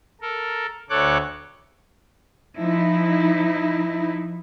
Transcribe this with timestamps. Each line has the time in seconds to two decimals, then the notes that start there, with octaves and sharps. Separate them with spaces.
0.21 A4 A#4
0.90 D2 A4 C#5 D6 F#6
2.58 F3 D#4 E4